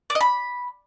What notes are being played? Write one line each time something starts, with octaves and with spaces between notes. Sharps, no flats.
D5
D#5
B5